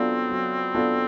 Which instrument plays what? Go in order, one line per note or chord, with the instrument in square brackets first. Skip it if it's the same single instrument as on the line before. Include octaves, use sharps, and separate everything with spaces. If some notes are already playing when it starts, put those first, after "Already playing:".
Already playing: [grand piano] F#3 B3 D4 F4 A4 [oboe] C4
[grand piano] F#3
B3 D4 F4 A4